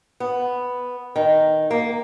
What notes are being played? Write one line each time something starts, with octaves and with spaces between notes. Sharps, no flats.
B3
D#3
A#3